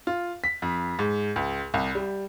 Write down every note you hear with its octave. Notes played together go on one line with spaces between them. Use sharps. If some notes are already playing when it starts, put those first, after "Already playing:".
F4
B6
F2
G#2
C#2
C2
G3